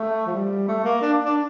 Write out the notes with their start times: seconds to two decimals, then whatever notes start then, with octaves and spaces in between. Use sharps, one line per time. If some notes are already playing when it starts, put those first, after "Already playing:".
Already playing: A3
0.26 F3
0.33 G3
0.68 A3
0.84 A#3
1.02 D4
1.25 D4